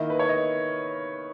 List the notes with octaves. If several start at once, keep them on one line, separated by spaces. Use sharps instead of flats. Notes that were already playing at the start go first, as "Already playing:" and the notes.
Already playing: D#3 A#3 E4 D#5
B4
C#5
D#5